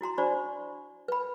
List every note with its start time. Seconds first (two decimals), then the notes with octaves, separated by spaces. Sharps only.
0.01 E4 F#4 A#5 C6
0.18 D4 F#4 C5 D5 B5 C#6
1.08 B4 B5